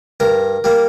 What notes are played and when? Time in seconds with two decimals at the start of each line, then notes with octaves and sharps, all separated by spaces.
0.20 G2 A#4
0.64 G3 A#3